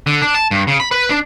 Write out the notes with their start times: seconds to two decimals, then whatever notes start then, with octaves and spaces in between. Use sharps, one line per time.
0.07 D3
0.22 D4
0.35 A5
0.51 G2
0.67 C#3
0.80 B5
0.91 B4
1.10 D4